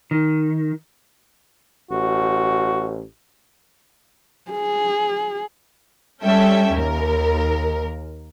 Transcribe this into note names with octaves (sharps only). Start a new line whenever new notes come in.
D#3
A1 F#4
G#4
G3 C#4 A4 E5 G5
D#2 A#4